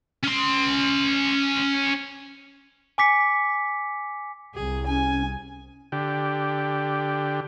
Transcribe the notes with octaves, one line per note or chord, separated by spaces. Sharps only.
C#4 C6
G#5 D6 B6 C#7
C2 G#4
C#4 G#5
D3 G4